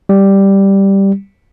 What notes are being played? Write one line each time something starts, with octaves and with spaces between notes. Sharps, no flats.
G3